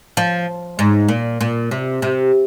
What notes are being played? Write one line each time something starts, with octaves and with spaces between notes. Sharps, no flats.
F3
G#2
A#2
A#2
C3
C3